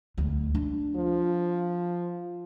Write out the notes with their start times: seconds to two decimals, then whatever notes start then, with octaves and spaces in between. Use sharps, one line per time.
0.18 D2 G#3
0.55 D4
0.96 F3